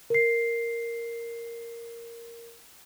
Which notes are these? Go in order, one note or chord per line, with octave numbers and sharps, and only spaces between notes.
A#4 C7